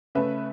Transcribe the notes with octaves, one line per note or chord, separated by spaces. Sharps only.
C#3 A3 B4 E5